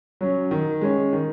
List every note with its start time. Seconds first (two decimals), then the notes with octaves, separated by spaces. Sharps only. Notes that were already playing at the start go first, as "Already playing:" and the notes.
0.21 F#3 C#4
0.51 D#3
0.81 G#3 C#4
1.13 D#3